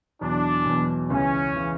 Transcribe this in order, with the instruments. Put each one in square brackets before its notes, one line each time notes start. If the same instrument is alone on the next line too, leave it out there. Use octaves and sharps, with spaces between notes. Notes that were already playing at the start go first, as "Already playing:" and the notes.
[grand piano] E2 B2 F#3 [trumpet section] D4
[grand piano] E2 B2 F#3
[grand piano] C#2 C#3 E3 [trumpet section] C#4
[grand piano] C#3 E3